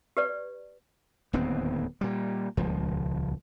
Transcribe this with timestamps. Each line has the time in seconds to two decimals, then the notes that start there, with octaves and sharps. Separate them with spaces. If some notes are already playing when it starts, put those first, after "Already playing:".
0.17 G4 B4 D5
1.33 D1 D#2 B3 C4
2.01 A#2 G3
2.57 D#1 C#2 F3